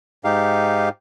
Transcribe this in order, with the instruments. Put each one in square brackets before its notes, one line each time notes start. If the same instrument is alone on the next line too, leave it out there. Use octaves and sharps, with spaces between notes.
[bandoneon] G#2 D#4 G4 F5